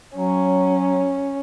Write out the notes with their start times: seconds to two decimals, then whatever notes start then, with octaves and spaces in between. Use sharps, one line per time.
0.16 F#3 C#4